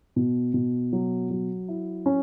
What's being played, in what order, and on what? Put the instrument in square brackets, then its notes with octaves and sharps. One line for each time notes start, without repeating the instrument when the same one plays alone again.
[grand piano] B2
B2
F#3
F#3
E4
C#4